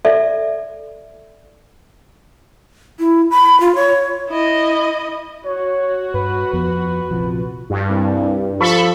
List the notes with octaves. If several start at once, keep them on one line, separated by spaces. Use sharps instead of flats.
A4 D5 E5
E4
B5
F4
C#5
E4 D#5
F#4 C#5
G2 B4
F2 F3 B3 B4
A#1 C3 F3
G2
C2
F3 A4 B5 C#6